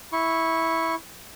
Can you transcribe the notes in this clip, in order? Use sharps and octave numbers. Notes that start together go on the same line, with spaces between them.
E4 C#6